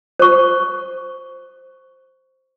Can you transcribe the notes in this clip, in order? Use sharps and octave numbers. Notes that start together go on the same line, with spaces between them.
C5 C#6